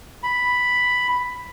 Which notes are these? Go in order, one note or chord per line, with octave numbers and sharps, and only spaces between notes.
B5